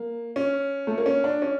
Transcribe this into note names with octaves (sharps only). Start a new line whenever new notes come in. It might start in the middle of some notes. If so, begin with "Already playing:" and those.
Already playing: A#3
C#4
A3
A#3
C#4
D4
C#4